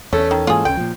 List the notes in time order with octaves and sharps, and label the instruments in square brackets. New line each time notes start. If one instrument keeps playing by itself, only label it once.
[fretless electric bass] E2 [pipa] A3 [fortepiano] C#4 A4
[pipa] D#3
[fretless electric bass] G#2 E3 A#3 [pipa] F4 G#4
[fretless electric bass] C#2 C#3 [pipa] G5
[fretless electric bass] A#2 F3